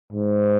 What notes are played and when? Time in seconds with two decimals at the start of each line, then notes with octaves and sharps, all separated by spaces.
0.13 G#2